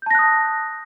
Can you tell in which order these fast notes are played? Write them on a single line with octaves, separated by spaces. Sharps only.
G6 A5 A#6 F#6 D#6